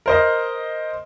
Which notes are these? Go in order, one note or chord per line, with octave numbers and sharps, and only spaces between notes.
A#4 C5 D#5